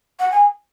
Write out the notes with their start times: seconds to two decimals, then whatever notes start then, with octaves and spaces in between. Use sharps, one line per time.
0.19 F#5
0.32 G#5